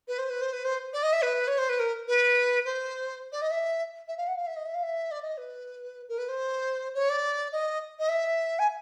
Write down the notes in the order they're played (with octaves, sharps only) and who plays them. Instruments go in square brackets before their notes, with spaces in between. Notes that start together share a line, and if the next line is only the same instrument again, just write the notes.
[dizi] B4
C5
B4
C5
B4
C5
D5
D#5
E5
B4
C#5
C5
B4
A#4
B4
C5
D5
D#5
E5
E5
F5
F#5
F5
E5
D#5
E5
F5
E5
D5
D#5
B4
A#4
B4
C5
C#5
D5
D#5
D#5
E5
G#5